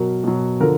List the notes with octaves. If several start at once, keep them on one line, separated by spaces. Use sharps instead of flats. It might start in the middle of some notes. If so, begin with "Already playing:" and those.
Already playing: B2 F#3 A#4
B2 F#3
D3 F3 A#4